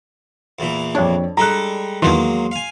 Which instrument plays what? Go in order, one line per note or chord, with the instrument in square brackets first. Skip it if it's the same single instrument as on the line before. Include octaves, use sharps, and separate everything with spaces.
[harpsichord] E2 A#2 E3
[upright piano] F2 C#5 [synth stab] D4
[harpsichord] G3 G#3 A4 [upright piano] A#5 F#6
[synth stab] E2 D#3 E3 [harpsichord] F#3 G#3 A#3 [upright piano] C6
[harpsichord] F5 G#5